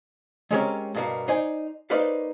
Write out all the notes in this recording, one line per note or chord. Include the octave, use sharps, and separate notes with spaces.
G#3 C4 C#4 G4 A#4 C#5
G2 B2 A#3
D#4 C5 D5 G#5
A#3 D#4 B4 C5 D5 F5